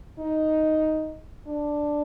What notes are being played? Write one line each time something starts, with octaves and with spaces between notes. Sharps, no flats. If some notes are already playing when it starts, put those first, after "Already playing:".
D#4
D4